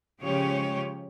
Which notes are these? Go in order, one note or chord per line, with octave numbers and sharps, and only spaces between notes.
C#3 F3 G#3 C#4 G4 C#5